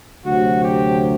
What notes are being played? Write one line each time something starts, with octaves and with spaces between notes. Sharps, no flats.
D2 C3 F#3 F#4
G4